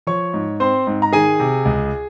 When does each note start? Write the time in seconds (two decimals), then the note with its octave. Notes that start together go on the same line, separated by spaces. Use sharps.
0.07 F3 C#5 C#6
0.34 G#2
0.60 C4 C5 C6
0.87 G#2
1.02 A#5
1.13 D#3 G#4 G#5
1.40 C3
1.65 C#2